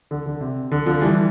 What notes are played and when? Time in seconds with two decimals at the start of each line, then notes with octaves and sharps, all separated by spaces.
0.11 D3
0.26 D3
0.41 C3
0.71 D3
0.86 D3 F3
1.01 E3 G3